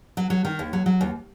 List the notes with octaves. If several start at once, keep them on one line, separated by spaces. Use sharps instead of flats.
F#3
F#3
D#3
D#2
F#3
F#3
D#2